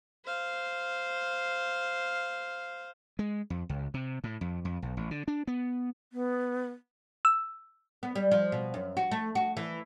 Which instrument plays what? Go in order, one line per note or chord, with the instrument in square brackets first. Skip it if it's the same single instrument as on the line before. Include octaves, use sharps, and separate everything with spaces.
[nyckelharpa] C5 F5
[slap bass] G#3
F2
C#2
C3
A2
F2
F2
B1
A1
D3
D4
B3
[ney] B3
[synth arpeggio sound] E6
[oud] B3
G3
F3
B2
F#2
F#4
A3
F#4
E3